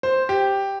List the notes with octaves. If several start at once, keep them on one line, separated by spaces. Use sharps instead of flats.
C5
G4